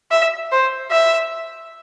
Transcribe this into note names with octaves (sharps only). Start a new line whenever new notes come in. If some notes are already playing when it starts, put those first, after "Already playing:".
E5
C5
E5